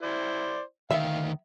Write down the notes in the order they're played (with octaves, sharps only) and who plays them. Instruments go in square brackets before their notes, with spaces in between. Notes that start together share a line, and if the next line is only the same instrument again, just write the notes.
[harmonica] E4 C5 D5
[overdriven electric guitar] D2 D#3 [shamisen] E5 [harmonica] F5